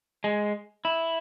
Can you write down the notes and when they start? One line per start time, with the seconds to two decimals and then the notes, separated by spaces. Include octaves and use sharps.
0.24 G#3
0.85 E4